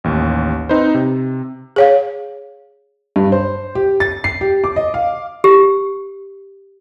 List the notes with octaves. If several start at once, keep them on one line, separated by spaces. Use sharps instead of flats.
A1 D#2
C4 D#4 B4 C5
C3
G#4 C#5 F5
G2
C5
G4
A6
C7
G4
D6
D#5
F5
G4